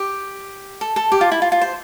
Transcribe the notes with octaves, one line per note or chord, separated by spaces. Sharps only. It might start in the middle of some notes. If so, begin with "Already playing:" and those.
Already playing: G4
A4
A4
G4
F4
E4
F4
F4
C5